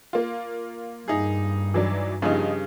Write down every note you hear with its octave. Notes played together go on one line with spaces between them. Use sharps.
A#3 F4
G2 D#4 G#4
E3 F#3 D4
G2 C#3 F3 D#4